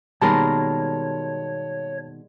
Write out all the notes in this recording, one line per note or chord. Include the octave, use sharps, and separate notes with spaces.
B2 D#3 G3 G#3 A#3 A#4 C#5 A5